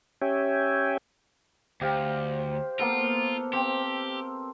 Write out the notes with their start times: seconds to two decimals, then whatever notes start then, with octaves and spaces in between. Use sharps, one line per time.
0.22 C#4 G4 C#5 E5 G5 G#5
1.81 D2 G4 C5 F5
2.79 A#3 B3 F4 A4
3.53 C4 G4